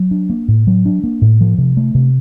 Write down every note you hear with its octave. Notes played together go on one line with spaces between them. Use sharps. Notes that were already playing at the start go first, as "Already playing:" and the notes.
Already playing: F#3
D4
A#3
A2
F#3
D4
A#3
A2
F3
C3
A3
C3